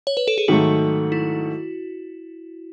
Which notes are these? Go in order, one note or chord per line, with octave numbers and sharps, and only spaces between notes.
C#5
B4
A4
G#4
G#2 D#3 F#3 A3 F#4
E4